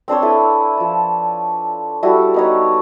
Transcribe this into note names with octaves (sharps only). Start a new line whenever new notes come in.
C4 D4 C5 C#5
E4 A4 B4
F3 A5
G3 E4 F#4 A4
B3 D#4 C#5